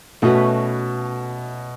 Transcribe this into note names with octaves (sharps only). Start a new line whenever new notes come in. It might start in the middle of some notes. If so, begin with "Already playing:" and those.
B2 A3 C#4 F#4 B4